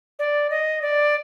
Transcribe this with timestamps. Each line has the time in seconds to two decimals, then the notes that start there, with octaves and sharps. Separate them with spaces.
0.19 D5
0.50 D#5
0.82 D5